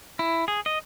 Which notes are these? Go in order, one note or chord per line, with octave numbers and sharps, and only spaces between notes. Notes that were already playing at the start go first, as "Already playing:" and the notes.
E4
G#4
D#5